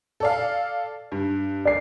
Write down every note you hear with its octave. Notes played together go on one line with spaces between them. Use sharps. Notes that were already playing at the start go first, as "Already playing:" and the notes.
A4 D5 F5
G2
D5 C7